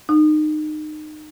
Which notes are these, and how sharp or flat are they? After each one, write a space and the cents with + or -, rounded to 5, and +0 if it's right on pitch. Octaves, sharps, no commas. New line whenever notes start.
D#4 -25